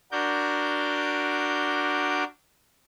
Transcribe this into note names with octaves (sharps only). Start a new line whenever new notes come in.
D4 F#4 A#4 D6 G6